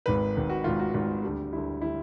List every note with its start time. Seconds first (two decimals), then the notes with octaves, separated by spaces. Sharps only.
0.06 G#1 G#2 D#3 B4
0.35 G#1 G#2 D#3
0.50 F#4
0.64 G#1 G#2 D#3 F4
0.80 F#4
0.94 G#1 G#2 D#3 F4
1.23 D2 D3 G3
1.52 D2 D3 G3 E4
1.82 D3 G3 E4